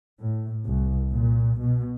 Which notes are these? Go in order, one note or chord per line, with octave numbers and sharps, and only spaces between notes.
A2
C2
A#2
B2